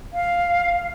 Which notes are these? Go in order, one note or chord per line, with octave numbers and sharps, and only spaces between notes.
F5